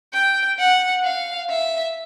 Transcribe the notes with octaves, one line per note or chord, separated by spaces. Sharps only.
G5
F#5
F5
E5